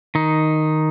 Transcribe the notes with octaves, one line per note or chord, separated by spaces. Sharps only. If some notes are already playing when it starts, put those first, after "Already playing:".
D#3 D#4